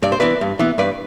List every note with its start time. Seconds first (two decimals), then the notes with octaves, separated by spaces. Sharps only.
0.03 G2 D5
0.12 C5
0.20 E3 B3 B4 D5
0.41 G2
0.59 E3 B3
0.78 G2 B4 D5